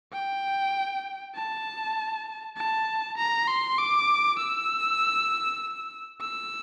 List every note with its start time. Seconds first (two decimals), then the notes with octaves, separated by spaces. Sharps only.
0.13 G5
1.35 A5
2.56 A5
3.17 A#5
3.47 C6
3.78 D6
4.39 E6
6.21 E6